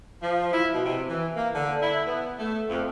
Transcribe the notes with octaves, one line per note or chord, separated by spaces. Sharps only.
F3
E4
B2
C3
E3
A#3
D3
E4
B3
A3
F2